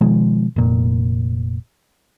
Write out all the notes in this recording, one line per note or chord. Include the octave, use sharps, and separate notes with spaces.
B2 D#3 F3 G#3
F1 A#2